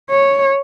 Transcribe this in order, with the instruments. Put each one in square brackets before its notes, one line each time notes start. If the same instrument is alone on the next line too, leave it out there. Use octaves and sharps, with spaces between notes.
[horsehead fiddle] C#5